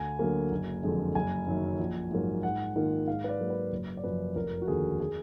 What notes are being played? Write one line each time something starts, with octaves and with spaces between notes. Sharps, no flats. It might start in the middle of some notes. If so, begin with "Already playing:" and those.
Already playing: D2 G#5
D3 F#3 A#3
F#1
F2 D3 G#3 D4
F#1 G#5
F#2 D#3 F#3
A#1
G#2 F#3 A#3
G#2 F#5
D#3 A#3 F4
G#2 F5
B4
D5
F#3 A#3
B4
F#1
D5
F#2 F3 B4
F1 A#4
F#4
D#2 D3 G#4
G#4